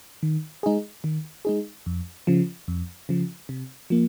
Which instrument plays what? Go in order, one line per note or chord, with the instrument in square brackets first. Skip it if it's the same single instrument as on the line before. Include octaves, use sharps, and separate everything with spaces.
[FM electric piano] D#3
G#3 D#4 G#4
D#3
G#3 D#4 G#4
F2
C#3 F3
F2
C#3 F3
C3
F3 A#3